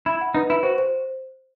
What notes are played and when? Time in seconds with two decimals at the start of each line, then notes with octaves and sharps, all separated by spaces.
0.06 E4 B5
0.21 F#5
0.35 D#4 B4
0.49 E4 B4
0.63 F#4 C5
0.78 C5